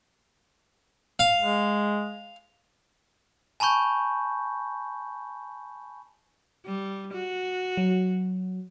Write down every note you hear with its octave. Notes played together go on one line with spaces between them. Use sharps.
F5
G#3
G#5 A5 B5 C#6 G6
G3
F#4
F#3